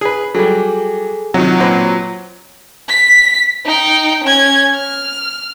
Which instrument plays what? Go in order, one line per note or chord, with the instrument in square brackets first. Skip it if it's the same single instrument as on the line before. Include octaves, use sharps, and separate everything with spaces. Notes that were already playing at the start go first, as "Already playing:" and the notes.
[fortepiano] G#4 B4
[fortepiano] F#3 G3 [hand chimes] G#4 A4 G#5
[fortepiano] C3 D#3 [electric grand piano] F#3 [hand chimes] F4 F#5
[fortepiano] A#2 C4 B4
[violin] B6
D#4 G5
C#4 G#6
F6